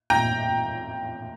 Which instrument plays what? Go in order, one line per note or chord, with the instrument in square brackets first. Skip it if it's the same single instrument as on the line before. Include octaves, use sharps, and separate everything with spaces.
[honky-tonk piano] G5 A#5